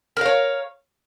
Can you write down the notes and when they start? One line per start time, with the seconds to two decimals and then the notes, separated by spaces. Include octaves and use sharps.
0.17 A#4
0.21 F5
0.26 C#5